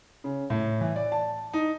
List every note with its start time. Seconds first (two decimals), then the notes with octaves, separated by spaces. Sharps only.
0.24 C#3
0.50 A2
0.81 E3
0.96 D5
1.12 A5
1.53 D#4